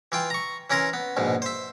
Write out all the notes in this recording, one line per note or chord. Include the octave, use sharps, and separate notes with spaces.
E3 F4 G5
A#5 C#6
E3 C#4 A#4 A#5 C6
B3
A#1 G#2 B2
C5 E5